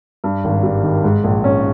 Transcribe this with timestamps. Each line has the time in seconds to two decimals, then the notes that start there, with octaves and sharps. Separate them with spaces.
0.24 G2
0.44 G#1
0.63 G3
0.83 D#3
1.04 G#2
1.24 A#1
1.44 C#4